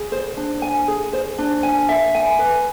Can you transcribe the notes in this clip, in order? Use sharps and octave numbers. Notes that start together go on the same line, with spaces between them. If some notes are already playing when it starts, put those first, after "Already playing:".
Already playing: G#4
C5
D4
G#5
G#4
C5
D4
G#5
E5
G#5
B4